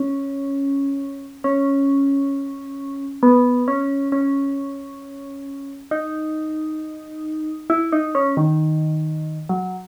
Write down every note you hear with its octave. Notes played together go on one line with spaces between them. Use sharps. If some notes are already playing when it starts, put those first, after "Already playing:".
Already playing: C#4
C#4
B3
C#4
C#4
D#4
E4
D#4
C#4
D#3
F#3